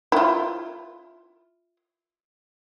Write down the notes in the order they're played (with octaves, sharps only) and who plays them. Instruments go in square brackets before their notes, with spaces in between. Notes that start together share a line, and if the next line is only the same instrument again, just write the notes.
[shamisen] E4 F4